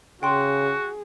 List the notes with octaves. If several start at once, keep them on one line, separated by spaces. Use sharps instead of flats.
C#3 F#4 G#4 G5 C6